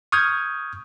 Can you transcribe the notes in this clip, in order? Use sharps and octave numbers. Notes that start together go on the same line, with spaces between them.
C#6 D#6 F6 G6 G#6